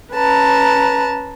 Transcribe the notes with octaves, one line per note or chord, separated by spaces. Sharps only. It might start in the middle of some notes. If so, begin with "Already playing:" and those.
C#4 B4 A5 A#5